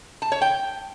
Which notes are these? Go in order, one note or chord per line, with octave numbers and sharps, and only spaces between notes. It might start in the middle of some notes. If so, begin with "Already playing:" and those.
A5
C#5
G5